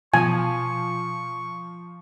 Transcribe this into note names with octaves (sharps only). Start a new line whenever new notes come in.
B2 F3 G#5 C#6